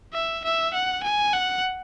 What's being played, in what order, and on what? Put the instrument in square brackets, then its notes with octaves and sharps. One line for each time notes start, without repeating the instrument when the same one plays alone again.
[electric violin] E5
E5
F#5
G#5
F#5